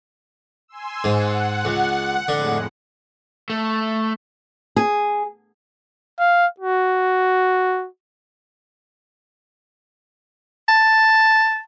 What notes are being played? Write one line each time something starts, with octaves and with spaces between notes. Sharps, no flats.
G#5 C6 E6
G#2 F#5
C#2
F2 A2 D3 G#3
A3
G#4
F5
F#4
A5